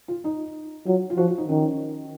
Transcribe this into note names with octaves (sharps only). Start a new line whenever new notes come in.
F4
D#4
F#3 F4
F4
F3 F#4
F4
D#4
D#3 C#4